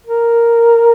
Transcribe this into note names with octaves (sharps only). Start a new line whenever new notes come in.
A#4